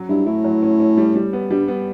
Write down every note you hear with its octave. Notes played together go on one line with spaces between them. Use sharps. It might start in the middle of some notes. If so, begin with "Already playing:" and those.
Already playing: F#3 C#4
G2 E4
A2 E4
F#3
C#4
C#4
G3
G3
B3
G2 G3
B3